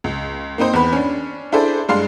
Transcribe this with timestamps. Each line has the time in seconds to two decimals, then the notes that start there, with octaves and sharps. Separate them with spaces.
0.04 C#2
0.58 A#3 C4 D#4 C5
0.73 E2 B4
0.92 C#4 D4
1.52 D4 E4 G#4 A4 C5 D5
1.89 G2 G#3 D4 F5 C6